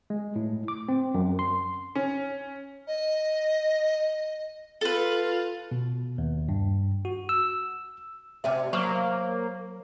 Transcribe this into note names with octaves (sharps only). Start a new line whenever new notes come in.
G#3
A2
D6
C4
F#2
C6
C#4
D#5
F4 A4 B4
B2
D#2
G2
F#4
E6
C3 C#4 E4 D5 E5 D6
F#3 A#3 C5 C#6 F7 F#7